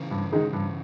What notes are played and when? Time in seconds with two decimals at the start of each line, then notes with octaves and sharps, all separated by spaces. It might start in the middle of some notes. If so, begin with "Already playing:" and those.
Already playing: C#3 E3
0.11 G2
0.32 D#3 G#3 D#4 G#4
0.53 G2